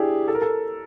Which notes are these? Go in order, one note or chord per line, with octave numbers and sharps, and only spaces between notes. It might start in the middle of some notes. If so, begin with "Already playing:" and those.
Already playing: D4 E4 G4 G#4
A4
A#4
A4